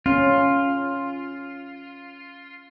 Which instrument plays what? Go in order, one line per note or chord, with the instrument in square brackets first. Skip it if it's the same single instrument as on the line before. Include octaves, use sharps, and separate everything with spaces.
[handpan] C#4 [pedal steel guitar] F4